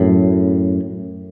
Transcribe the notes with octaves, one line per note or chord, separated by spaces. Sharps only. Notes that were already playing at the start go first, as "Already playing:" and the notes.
Already playing: F#2 A2